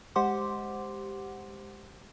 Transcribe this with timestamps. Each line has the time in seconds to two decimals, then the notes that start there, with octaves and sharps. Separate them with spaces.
0.16 G#3 G4 C5 F#5 C6 D6